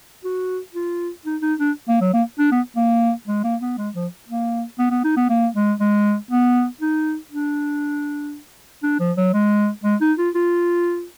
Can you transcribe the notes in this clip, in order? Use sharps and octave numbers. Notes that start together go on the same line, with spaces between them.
F#4
F4
D#4
D#4
D4
A#3
F#3
A#3
D4
B3
A#3
G#3
A#3
B3
G#3
F3
A#3
B3
B3
D#4
B3
A#3
G#3
G#3
B3
D#4
D4
D4
F3
F#3
G#3
G#3
D#4
F4
F4